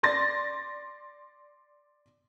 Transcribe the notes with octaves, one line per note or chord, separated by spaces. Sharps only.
D5 C6 A6 A#6